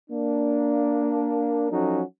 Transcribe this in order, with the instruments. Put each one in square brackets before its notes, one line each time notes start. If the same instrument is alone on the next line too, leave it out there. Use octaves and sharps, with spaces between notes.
[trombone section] A#3 D4
F3 F#3 C#4 D#4 F#4 A4